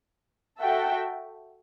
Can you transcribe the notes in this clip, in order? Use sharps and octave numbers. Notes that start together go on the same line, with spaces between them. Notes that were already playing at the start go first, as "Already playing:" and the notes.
F#4 A4 E5 G5